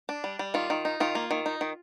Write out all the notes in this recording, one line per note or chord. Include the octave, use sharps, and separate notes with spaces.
D4
G3
G3
D#3 F4
D#3
D#4
D#3 F4
A#3
D#3
D#4
D#3